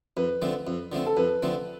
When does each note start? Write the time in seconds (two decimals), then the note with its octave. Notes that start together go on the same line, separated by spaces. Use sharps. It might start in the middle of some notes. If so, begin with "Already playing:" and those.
0.17 F2 B4
0.42 D3 F3 A3 C4
0.67 F2
0.92 D3 F3 A3 C4
1.06 A4
1.17 F2 B4
1.42 D3 F3 A3 C4